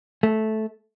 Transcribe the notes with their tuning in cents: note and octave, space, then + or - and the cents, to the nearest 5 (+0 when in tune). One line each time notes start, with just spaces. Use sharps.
A3 -10